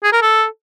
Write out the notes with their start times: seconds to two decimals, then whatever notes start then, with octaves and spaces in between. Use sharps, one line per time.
0.03 G#4
0.13 A#4
0.22 A4